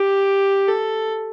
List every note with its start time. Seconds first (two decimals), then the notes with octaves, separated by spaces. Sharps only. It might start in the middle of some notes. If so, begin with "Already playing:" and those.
Already playing: G4
0.68 A4